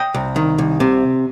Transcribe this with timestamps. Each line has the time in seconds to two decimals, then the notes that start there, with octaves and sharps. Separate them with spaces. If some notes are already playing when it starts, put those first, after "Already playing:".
Already playing: D#5 G5
0.14 C2
0.36 D#3
0.58 C2
0.80 C3